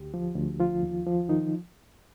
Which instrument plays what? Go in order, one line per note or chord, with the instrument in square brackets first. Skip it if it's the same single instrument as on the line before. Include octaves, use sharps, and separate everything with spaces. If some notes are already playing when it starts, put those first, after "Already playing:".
Already playing: [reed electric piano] D2 G4
F3
D2
F3 F4
D#2
F3
D#3 D#4